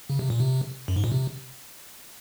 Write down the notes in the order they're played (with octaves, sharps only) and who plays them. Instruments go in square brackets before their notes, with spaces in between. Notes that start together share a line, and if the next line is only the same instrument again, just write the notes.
[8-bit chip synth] C#3
C3
A#2
C3
F#2
G#2
A#2
C3